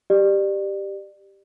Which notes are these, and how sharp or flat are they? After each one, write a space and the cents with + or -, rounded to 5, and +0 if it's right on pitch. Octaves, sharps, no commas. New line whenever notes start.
G4 +0 D5 +30